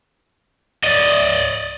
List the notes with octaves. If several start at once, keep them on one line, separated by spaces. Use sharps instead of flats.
D5 D#5